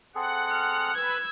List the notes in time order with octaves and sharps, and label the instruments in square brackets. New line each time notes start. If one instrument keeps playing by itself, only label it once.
[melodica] C4 G#4 A4 [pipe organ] F#5
[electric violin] F6
[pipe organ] B4 [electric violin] E6 G#6